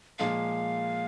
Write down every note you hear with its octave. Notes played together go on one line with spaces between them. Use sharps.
A#2 F3 G#3 F5